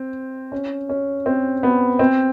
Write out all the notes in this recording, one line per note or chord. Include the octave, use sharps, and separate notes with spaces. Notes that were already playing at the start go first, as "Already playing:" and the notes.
Already playing: C4
C#4
C#4
C4
B3
C4